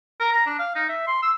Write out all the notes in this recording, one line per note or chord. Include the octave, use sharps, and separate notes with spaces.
A#4
A#5
D4
F5
D#4
E5
C6
E6